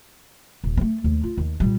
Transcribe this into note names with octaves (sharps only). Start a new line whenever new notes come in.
D#1
A3 C4
D#2
F4
D#2
A#2 G3